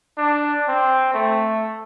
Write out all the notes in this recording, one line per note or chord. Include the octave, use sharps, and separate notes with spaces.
D4
C4
A3